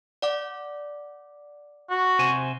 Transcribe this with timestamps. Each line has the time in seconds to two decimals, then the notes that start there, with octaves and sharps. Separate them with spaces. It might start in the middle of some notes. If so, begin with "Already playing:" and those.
0.22 D5 F#5 D6
1.90 F#4
2.19 C3 C5 G#5